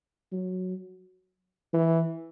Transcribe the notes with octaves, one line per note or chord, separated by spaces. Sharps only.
F#3
E3